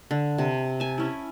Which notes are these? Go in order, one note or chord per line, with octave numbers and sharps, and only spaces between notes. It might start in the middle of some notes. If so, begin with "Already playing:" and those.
D3
C3
G#5 A5
C#4 E4